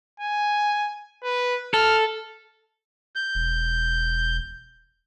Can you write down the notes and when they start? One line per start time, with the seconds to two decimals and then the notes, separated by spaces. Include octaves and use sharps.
0.20 G#5
1.24 B4
1.74 A4 F6
3.16 G6
3.35 E1